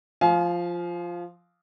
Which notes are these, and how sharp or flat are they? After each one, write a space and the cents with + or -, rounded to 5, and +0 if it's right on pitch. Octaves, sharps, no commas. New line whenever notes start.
F3 +0 F5 +0 G#5 +40